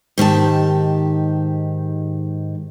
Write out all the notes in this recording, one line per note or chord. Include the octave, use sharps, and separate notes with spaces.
G#2 D#3 G4 A5